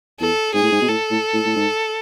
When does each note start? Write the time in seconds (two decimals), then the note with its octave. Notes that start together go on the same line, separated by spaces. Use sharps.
0.20 E2 A4
0.54 G#2 G#4
0.63 A2
0.72 G#2
0.81 B2
0.88 A2 A4
1.11 A2
1.34 A2
1.46 A2
1.56 G#2